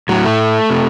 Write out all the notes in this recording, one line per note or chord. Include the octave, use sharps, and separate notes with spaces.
A2 F#3
A3
C3